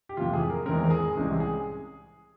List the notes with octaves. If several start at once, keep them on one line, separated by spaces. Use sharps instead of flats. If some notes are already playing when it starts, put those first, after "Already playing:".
G4
F2 C3 E3 F4
G#4
A#4
E2 E3 G#3 C4 A#4
A#4
G#4
C2 C3 E3 G#3 C#4
G#4